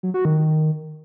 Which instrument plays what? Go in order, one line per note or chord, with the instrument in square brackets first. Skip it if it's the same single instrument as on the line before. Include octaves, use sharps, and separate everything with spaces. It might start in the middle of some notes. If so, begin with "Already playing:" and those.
[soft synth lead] F#3
F#4
D#3